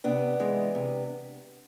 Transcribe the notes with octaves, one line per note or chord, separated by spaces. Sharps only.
C3 B3 D4
E3 G#3
C3